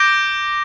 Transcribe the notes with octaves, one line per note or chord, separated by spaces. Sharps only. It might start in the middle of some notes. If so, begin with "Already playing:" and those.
Already playing: D6 G6 A#6 D7 G7